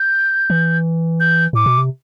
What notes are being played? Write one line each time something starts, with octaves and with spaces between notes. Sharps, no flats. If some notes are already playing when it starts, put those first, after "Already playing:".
Already playing: G6
E3
G6
A2 D6
B2
C3